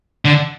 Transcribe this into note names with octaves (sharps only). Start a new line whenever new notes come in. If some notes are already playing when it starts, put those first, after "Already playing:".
D3